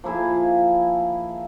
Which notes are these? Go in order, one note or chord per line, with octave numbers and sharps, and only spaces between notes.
F3 A#3 E4 G#4